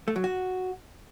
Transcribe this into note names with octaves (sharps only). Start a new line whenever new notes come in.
A3
F#3
F#4